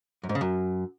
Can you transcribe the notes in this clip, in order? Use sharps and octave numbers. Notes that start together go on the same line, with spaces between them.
F#2
G#2
C#3
F#2